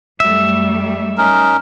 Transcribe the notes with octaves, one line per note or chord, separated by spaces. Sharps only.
F#2 G3 A3 E5
C#4 D#4 A#4